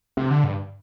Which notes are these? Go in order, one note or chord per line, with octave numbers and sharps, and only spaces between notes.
C3
D3
G2